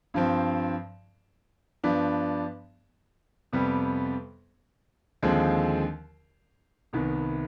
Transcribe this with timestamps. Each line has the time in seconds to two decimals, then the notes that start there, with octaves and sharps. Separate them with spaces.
0.14 G2 F3 C4
1.84 G2 F3 B3 D4
3.53 F2 C3 G3 B3
5.23 D#2 D3 F3 G#3 C4
6.93 C2 C3 D#3 B3